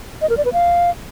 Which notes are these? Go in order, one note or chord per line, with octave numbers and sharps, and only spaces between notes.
D#5
A#4
D5
B4
F5